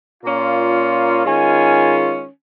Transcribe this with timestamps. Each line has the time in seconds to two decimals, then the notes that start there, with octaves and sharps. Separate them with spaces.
0.23 A#2 A#3 C#4 F4
1.25 D#3 G#3 C#4 F4 G#5